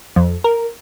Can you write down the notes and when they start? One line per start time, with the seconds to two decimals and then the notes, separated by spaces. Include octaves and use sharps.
0.16 F2
0.44 A#4